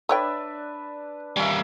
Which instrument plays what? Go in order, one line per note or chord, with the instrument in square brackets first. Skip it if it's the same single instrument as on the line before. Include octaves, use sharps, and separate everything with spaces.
[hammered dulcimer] D4 D5 E5 [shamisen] A4 C#5 G5 [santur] B4
[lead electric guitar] G3 A#3 [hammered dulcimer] C#4 E5